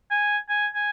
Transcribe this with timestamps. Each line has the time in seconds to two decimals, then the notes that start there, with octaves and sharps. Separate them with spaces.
0.11 G#5
0.49 G#5
0.75 G#5